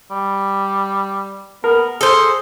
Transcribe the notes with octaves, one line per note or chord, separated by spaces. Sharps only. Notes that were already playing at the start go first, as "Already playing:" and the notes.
G3
B3 A#4
G#4 A4 C5